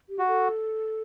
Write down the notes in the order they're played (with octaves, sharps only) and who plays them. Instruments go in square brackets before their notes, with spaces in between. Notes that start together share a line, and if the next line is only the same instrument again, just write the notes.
[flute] G4
[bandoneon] F#4
[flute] A4